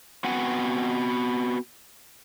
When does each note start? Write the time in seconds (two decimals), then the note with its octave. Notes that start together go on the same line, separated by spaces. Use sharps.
0.24 B3 C4 F#4 F#5 G#5